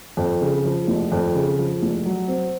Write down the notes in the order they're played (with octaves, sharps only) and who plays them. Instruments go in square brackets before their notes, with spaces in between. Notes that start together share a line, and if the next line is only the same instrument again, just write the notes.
[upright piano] F2
C#3
F3
F1
F2
C#3
F3
F1
F#3
C4